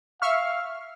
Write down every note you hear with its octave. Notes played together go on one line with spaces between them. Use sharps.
E5 F5 C#6 F6